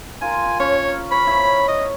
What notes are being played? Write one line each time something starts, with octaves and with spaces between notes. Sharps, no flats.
F4 A#4 G#5
C#4 C#5
C#5 B5
E4 C#5
D#5